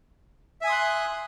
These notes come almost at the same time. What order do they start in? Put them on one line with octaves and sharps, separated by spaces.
E5 G#5 D#6 C6 F#6